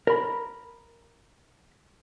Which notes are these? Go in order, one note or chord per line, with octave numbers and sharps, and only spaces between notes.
A#4 B5